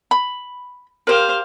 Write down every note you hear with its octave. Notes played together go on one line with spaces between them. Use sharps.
B5
G4 A#4 C5 F5